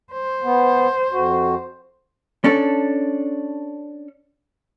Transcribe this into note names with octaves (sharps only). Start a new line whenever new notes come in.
C5
B3
F2 F#4
C#4 D4 A4